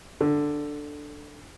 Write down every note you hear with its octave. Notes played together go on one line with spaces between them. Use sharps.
D3